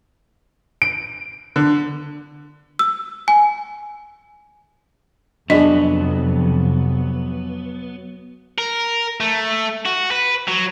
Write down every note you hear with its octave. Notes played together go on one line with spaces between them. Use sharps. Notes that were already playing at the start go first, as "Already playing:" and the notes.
D7
D3
E6
G#5
F2 C3 F#3 B3 D4 G#4 D#5
A#4
A3
F#4
B4
F#3